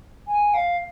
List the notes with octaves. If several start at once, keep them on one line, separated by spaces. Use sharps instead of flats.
G#5
F5